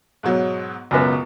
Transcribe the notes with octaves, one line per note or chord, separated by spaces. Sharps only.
G#2 B2 F#3
C#2 F#2 B2 B3